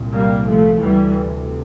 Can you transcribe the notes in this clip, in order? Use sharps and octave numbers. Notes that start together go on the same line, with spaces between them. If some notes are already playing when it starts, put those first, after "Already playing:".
Already playing: C2 A#2
G3 A#3
F3 A3
D2 C3 E3 G3